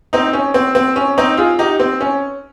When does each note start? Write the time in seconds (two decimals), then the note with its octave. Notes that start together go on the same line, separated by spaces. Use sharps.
0.13 C4 D#4
0.33 C#4
0.54 C4
0.75 C4
0.96 C#4
1.18 C4 D#4
1.37 F4 G#4
1.59 D#4 G4
1.80 C4
2.01 C#4